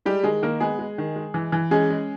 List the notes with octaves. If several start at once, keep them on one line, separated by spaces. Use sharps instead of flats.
G3 G#3 G4
D#3 G#3 G#4
D#3 A#3 A#4
G#3 B3 G#4
G#3
D#3
G#3
E3
E3
G#3 C#4 G#4
G#3